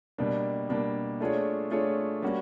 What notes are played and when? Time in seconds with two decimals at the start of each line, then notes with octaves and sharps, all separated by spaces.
0.18 B2 G3 A#3 D4
0.69 B2 G3 A#3 D4
1.21 A3 D4 F4 G#4 C#5
1.71 A3 D4 F4 G#4 C#5
2.22 G3 A#3 C#4 F#4